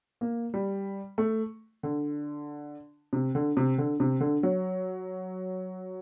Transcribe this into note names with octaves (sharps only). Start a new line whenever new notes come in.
A#3
G3
A3
D3
C3
D3
C3
D3
C3
D3
F#3